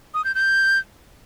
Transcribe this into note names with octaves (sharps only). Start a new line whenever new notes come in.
D#6
G6
G6